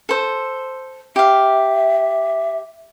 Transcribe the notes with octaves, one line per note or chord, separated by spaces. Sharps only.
A4 C5
G4 E5 F5